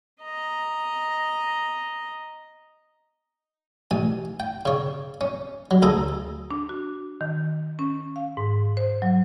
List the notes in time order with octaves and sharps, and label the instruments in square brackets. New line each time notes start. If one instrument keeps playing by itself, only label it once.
[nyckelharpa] D#5 A#5
[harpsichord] A1 G#5
G5
C#3 C#5
C#4
F#3
D2 G#4 A4 A#5
[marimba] D4
F#4
D#3
C#4
F5
G#2
C5
F#3